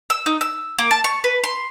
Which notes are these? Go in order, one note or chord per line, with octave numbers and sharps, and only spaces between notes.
E6
D#4
E6
A#3
A5
C#6
B4
C6